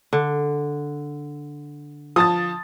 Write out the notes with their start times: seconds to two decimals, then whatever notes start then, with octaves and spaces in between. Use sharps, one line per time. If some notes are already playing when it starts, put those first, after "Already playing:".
0.13 D3
2.16 F3 A5 D#6 A6